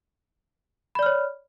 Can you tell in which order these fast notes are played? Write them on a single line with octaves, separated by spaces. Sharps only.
B5 D5 F6 C#5